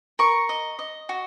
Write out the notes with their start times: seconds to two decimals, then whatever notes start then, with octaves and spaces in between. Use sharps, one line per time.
0.19 A#4 C#6
0.49 D#5
0.79 D#5
1.09 F#4